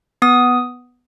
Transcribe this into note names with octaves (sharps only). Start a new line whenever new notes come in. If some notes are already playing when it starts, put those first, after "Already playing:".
B3 D#6